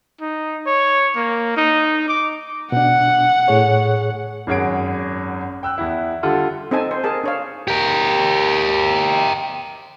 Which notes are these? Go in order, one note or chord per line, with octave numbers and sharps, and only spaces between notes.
D#4
C#5
A#3
D#4
D6
B2 D4 F#5
A2 G#4 C#5
G#1 F#2 G#4 C#5 D7
G5 E6 F#6
E2 E4
D3 G3 F4 A4 F#5
C4 D#4 A4 D#5 G#5 A5
C5
G#4 A#4 A5
D4 C#5 F5
G4 A#4